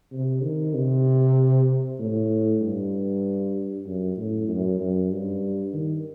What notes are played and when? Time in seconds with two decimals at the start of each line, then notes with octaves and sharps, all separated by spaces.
0.12 C3
0.43 D#3
0.74 C3
1.99 A2
2.61 G2
3.86 F#2
4.17 A2
4.48 F#2
4.80 F#2
5.11 G2
5.73 D#3